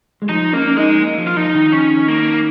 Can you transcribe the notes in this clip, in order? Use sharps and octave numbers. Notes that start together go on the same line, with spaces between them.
G#3
F3 D#4
A#3 C#4
C#4
G#3 D#4
A#3
F3
F4
F3 D#4
D#3
C#4
A#3